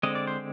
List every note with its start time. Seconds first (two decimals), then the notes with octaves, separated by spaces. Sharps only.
0.03 D3 G#3 C4 D#5
0.15 D5
0.27 C5